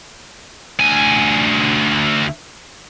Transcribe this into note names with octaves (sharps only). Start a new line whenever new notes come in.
D2 G#5